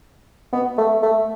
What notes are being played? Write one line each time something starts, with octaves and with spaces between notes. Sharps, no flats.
B3
A3
A3